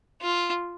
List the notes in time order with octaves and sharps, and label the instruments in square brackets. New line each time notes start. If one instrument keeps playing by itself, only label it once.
[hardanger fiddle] F4